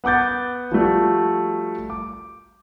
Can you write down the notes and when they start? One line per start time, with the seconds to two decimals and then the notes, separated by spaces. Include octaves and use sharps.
0.04 B3 F#5 D6 G6 A6
0.72 F3 G3 A3 F#4
1.90 D6